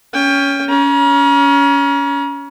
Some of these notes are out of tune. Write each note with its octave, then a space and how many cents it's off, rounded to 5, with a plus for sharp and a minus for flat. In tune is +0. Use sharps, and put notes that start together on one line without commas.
C#4 +15 G5 +20
C#4 +25 A#5 +45